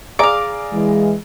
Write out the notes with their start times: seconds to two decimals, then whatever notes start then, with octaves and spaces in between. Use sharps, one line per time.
0.19 G#4 D5 F5 A#5 D6
0.73 E3 G#3